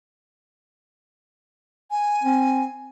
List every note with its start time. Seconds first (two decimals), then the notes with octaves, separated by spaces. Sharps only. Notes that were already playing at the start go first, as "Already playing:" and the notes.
1.91 G#5
2.24 C4